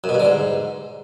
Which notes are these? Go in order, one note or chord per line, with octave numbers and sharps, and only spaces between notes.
F#2
B2
G2
D3
G#2